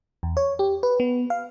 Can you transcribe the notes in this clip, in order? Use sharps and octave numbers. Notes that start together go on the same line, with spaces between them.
E2
C#5
G4
B4
B3
F5